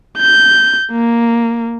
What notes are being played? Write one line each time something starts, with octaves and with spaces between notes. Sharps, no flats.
G6
A#3